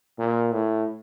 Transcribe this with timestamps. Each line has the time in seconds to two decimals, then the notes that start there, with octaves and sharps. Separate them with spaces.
0.19 A#2
0.52 A2